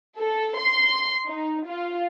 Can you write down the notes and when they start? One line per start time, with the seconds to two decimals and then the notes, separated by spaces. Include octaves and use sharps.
0.19 A4
0.59 C6
1.27 D#4
1.67 F4